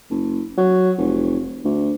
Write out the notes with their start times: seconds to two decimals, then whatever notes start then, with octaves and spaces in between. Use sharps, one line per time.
0.10 F#1
0.57 F#3
0.98 F1
1.65 D2